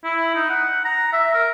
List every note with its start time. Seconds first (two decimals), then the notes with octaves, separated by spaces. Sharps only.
0.04 E4
0.35 D#4
0.50 F#5
0.85 A#5
1.13 E5
1.34 A#4